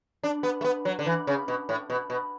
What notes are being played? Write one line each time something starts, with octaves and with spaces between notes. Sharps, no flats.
D4
B3
A3
B3
F#3
D3
E3
C#3
B2
A2
B2
B2